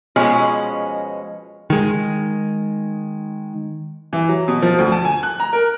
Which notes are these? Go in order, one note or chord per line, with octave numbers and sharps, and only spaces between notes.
B2 F3 G#3 C#4
D#3 G#3
E3
F#3
B2
F3
D2
A5
G#5
F#6
A#5
A#4